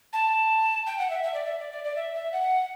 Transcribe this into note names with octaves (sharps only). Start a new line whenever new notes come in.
A5
G5
F#5
E5
E5
D5
E5
D5
D5
D5
E5
E5
F#5